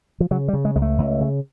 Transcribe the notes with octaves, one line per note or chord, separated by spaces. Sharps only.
F3
C#3 F#3
G3
C#3
G#3
C#2 G#3
A3
C#2
C#3